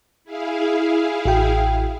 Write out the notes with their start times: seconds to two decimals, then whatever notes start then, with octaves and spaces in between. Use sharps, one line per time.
0.24 E4 G#4 F5
1.26 A1 F#4 G5